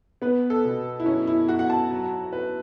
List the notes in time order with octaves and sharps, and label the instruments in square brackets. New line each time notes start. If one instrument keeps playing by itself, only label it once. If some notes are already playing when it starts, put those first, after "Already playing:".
[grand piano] B3 [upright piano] B4
[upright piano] A4
[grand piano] B2
[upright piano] E4
[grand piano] F#2 [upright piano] C#4
[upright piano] E4
[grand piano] F#3 [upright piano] F#4
[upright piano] F#5
A5
[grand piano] F#3
B4